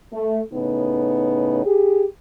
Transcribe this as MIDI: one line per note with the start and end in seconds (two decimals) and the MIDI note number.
0.13 0.40 57
0.53 1.62 45
0.53 1.62 49
0.53 1.62 59
0.53 1.62 63
1.65 2.04 67
1.65 2.04 68